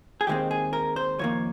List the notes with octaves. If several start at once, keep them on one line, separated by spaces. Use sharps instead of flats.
G#4
D#2 D#3 G#3 C4 G4
G#4
A#4
C5
F2 D#3 A#3 C#5